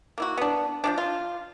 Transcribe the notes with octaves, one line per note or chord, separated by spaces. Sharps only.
A#3 E4 F#4
B3 D4
F3 G#3 D4
F4